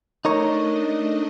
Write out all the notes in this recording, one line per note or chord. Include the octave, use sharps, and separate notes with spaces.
A3 D4 D#4 A#4 C#5 D#5